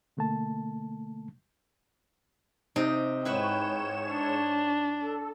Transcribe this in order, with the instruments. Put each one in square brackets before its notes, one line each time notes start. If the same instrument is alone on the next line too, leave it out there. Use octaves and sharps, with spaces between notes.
[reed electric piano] B2 D3 A3 A#3 A5
[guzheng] C3 D#4 G5
[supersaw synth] G#2 C#5 E7 [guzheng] E4 B4 F#5 [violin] G5
[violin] D4
[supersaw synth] A4